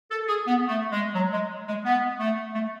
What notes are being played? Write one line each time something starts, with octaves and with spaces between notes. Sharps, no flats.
A4
G#4
B3
A3
G#3
F#3
G#3
G#3
B3
A3
A3